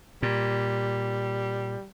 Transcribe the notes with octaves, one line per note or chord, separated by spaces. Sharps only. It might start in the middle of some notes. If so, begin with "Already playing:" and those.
A#2 G3